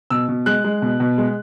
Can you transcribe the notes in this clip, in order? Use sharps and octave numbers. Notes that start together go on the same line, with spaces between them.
B2 E6
B2
G#3 F#6
G#3
B2
B2
G#3